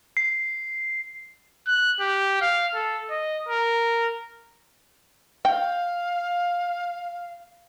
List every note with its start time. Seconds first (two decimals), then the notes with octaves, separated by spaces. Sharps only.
0.17 C7
1.67 F#6
2.00 G4
2.41 F5
2.75 A4
3.10 D#5
3.49 A#4
5.45 F5 G5